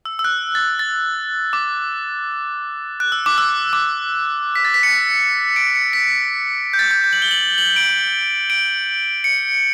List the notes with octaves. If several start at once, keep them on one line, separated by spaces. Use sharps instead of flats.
E6
E6
F#6
A6
A6
D6
F#6
E6
D6
E6
D6
B6
A6
B6
C#7
D7
C#7
B6
G6
A6
G6
G6
F#7
G7
F#7
F#7
D7
D7
C#7